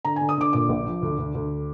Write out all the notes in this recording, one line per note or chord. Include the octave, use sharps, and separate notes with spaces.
D3 A#5
D3 G#5
D#6
D3 D6
A#2 D6
A#1
F3
D2
D2
D2